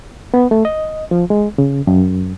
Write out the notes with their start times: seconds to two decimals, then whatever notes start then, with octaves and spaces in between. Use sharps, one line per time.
0.34 B3
0.51 A3
0.65 D#5
1.11 F3
1.30 G#3
1.58 C#3
1.87 F#2